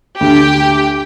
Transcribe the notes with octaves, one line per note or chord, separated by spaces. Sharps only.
D2 G4 G5